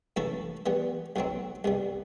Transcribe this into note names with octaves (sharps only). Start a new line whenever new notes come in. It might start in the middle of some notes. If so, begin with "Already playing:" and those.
F#2 E3 A3 E4 A4
E3 G3 B3
B1 B2 F#3 C4
C2 B2 G3